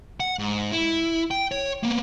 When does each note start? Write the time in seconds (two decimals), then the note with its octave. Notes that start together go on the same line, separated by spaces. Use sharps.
0.20 F#5
0.39 G#2
0.72 E4
1.31 G5
1.52 C#5
1.83 A#3 B3